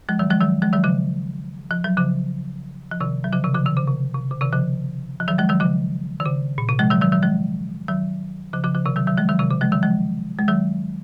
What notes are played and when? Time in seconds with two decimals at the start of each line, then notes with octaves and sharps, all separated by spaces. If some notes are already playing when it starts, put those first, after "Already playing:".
0.09 F3 G#3
0.19 D#3 F#3
0.30 F3 G#3
0.41 D#3 F#3
0.62 F3 G#3
0.73 D#3 F#3
0.84 C#3 F3
1.71 F3
1.84 F#3
1.97 C#3 F3
2.91 F3
3.00 C3 D#3
3.24 F#3
3.33 C#3 F3
3.44 C3 D#3
3.55 C#3 F3
3.66 C3 D#3
3.77 C#3
3.87 C3
4.14 C3
4.31 C#3
4.41 C3 D#3
4.52 C#3 F3
5.20 F3
5.28 D#3 F#3
5.38 F3 G#3
5.49 D#3 F#3
5.60 C#3 F3
6.20 D#3
6.25 C#3
6.58 A#2
6.69 C3
6.79 F3 G#3
6.90 D#3 F#3
7.01 D#3 F#3
7.12 D#3 F#3
7.22 F3 G#3
7.88 D#3 F#3
8.53 C#3 F3
8.64 C#3 F3
8.75 C#3 F3
8.86 C3 D#3
8.96 D#3 F#3
9.07 D#3 F#3
9.17 F3 G#3
9.29 D#3 F#3
9.39 C3 D#3
9.50 C#3
9.61 F3 G#3
9.72 D#3 F#3
9.83 F3 G#3
10.39 G#3
10.48 D#3 F#3